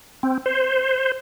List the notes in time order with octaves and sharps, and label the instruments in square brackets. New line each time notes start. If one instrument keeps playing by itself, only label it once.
[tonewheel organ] C4
C5